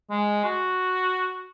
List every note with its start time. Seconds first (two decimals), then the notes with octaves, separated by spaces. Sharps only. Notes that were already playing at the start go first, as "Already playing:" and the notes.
0.11 G#3
0.45 F#4